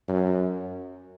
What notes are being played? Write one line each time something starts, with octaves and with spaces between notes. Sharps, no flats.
F#2